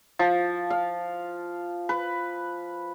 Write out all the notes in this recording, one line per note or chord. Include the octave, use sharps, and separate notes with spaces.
F3
F5
B4